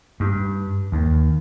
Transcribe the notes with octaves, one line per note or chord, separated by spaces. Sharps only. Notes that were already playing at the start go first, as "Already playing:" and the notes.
G2
D#2